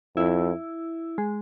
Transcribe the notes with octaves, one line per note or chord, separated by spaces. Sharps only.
F2 E4
G#3